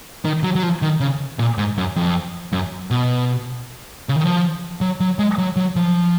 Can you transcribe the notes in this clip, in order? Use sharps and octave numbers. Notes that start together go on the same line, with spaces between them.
D#3
F#3
F#3
F3
D#3
C#3
A#2
G#2
F#2
F2
F#2
B2
C#3
D#3
F3
F#3
F#3
G#3
F#3
F#3
F3